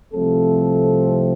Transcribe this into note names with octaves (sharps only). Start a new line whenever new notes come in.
C2 C3 F3 A3 C4 A4